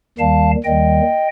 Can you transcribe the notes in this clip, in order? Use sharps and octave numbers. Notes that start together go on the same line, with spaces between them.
D#2 D#3 G3 F5 A5
D#2 D#3 G3 D#5 G5